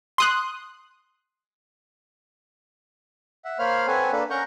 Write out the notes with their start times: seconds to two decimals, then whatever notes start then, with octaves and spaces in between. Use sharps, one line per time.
0.18 C6 D#6 F#6
3.45 E5 F#5
3.59 A#3 C5 C#5 F5 B5 F6
3.87 C4 A4 B4 C#5 F#5 G#5
4.12 A#3 D4 A4 B4
4.30 C#4 A#4 F#5 A#5 C#6 G6